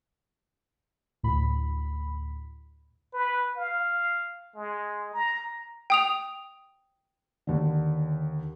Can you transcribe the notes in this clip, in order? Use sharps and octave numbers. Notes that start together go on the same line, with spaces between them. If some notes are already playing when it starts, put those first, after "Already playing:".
D2 A2 B5
B4
F5
G#3
A#5
G5 D#6 F7
D#2 D3